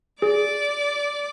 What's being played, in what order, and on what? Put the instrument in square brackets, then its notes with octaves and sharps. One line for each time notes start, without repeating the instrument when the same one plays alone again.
[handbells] G#4 [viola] D5 D6